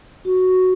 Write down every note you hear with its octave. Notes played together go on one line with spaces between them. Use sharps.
F#4